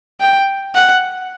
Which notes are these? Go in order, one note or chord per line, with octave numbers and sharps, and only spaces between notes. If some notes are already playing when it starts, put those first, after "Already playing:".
G5
F#5